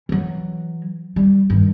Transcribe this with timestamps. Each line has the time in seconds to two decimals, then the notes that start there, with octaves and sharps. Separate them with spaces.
0.09 E3 F#3
1.16 G3
1.50 G2 D#3